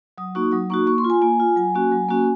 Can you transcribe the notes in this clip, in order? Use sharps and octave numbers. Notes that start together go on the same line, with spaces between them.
F#3 D#6
A#3 D#4 F#4 C#6
F#3 D#6
A#3 D#4 F#4 C#6
A#3 C#6
C6
F4
G#5
A#3 G#5
F4
F#3 G#5
A#3 C#4 F#4
F#3
A#3 C#4 F#4